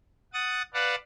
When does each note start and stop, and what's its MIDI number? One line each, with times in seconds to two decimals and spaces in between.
0.33 0.62 78
0.33 0.62 87
0.33 0.62 93
0.74 0.95 71
0.74 0.95 74
0.74 0.95 77
0.74 0.95 78
0.74 0.95 81